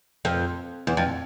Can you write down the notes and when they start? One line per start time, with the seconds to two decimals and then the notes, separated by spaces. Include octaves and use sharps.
0.25 F2
0.87 E2
0.97 F2